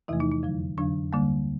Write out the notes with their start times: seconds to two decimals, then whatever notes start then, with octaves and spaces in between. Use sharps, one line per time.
0.08 E2 C3 E3 F3 A3 E4
0.20 D#4
0.32 D#4
0.43 F2 D3 F#3
0.78 F2 D3 F#3 D4
1.13 D2 D3 G3 A#3